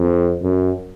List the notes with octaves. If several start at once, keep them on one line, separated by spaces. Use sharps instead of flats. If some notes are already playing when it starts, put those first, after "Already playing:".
Already playing: F2
F#2